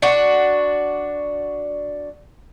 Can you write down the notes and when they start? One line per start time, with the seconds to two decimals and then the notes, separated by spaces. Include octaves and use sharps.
0.02 D4 F#4